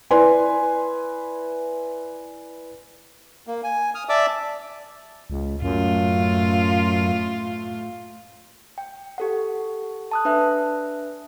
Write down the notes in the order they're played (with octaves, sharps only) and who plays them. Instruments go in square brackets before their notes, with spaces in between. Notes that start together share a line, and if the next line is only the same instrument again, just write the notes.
[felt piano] E4 B4 D5 G#5 C6
[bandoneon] A#3
G#5
D#6 F6
D5 E5 A5 D6 E6
[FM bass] C#2
[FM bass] F#2 [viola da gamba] A2 F4
[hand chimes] G5
G4 A4 F#5
A5 D#6 F#6
D4 B4 E5 F#6